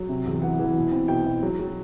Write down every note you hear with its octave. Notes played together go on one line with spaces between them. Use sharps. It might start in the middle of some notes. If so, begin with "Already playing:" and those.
Already playing: F#3
C3
E2
E3 F#5
E3
B2
C4
B2 G5
B2
F#3
F#3